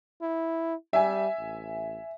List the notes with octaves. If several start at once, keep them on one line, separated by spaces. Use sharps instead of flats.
E4
G3 E5 G#5
A1